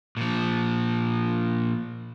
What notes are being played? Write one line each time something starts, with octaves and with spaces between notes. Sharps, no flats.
A#2 F3